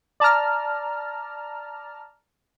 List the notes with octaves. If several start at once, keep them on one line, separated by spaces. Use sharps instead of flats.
D5 A5 A#5 F6